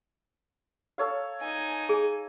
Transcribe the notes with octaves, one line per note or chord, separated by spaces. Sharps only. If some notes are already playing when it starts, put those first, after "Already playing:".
A4 C#5 F5
D#4 G#5
G#4